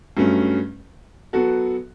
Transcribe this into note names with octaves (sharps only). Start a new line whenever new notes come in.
G2 F#3 A3 C#4
F#3 B3 F#4 A4